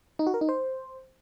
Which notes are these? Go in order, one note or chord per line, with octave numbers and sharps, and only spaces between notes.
D#4
F#4
A#4
D#4
C5